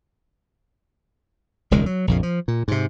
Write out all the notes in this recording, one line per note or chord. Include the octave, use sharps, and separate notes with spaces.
E1 C#2 D#3 G#3
F#3
A#1 F2 C#3
F3
A#2
G#2 C3